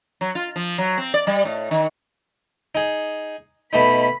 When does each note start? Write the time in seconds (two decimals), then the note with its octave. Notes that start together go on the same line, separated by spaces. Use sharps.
0.21 F#3
0.35 F4
0.56 F3
0.78 F#3
0.98 C4
1.14 D5
1.27 G3
1.45 A2
1.71 D#3
2.75 D#4 G#4
3.73 B2 A3 D#4 B5